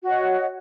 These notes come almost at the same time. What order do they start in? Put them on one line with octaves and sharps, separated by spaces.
F#4 C#5 D#5